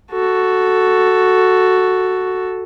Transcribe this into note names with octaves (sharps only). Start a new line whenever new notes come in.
F#4 A4